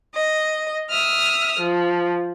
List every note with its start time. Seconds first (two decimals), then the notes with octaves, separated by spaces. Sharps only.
0.14 D#5
0.90 E5 D#6 F6
1.59 F3